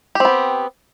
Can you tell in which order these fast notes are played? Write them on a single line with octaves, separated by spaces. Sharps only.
G4 C4 B3